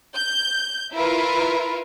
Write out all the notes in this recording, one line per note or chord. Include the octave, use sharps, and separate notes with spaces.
G6
E4 F4 A#4 B4